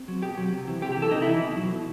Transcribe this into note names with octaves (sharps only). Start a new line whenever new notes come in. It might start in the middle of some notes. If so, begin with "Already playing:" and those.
Already playing: C4
F#3
B2 G4
F#3
C3
E3
C3 G4
E3 G4
A4
C3 D#4
E3 E4
B2
F#3
B2